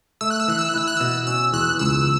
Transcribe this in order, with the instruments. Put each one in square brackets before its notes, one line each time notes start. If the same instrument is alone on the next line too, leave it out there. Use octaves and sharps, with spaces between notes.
[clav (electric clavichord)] A3 [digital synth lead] E6
[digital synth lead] F#6
E6
[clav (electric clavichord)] E3 [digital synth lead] F#6
[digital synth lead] E6
F#6
[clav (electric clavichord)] E4 [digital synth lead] E6
[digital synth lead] F#6
[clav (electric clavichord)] B2 [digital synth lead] E6
[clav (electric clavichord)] C#4 [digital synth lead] E6
[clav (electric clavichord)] E2 [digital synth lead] F#6
[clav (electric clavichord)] C#2 [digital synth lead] E6